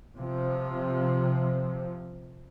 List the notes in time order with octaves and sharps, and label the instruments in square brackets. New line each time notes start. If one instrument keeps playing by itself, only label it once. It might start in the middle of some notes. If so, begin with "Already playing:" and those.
[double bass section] C3 F3